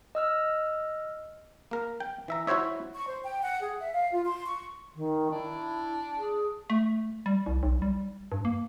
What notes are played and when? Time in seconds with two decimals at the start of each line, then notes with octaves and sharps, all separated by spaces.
0.15 D#5 E6 F6
1.71 A#3 A#4
2.00 G5
2.28 E3 E5 A#5
2.47 E4 F#4 C5 C#5 E5
2.94 C#6
3.07 C5
3.23 G5
3.42 F#5
3.61 G#4
3.78 E5
3.93 F5
4.12 F4
4.24 C6
4.47 C#6
4.95 D#3
5.32 D4 E4
6.18 G#4
6.70 A3
7.26 G3
7.46 C2
7.63 B1
7.82 G3
8.32 G2
8.45 A#3